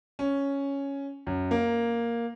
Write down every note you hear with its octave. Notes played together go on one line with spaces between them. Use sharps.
C#4
F#2
A#3